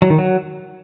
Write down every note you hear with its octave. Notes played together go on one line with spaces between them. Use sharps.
F#3
D#3
F#3